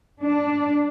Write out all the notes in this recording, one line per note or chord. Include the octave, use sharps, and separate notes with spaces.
D4